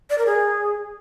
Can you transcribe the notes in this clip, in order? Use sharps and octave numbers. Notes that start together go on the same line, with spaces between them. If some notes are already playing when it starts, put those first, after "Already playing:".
D5
A#4
G#4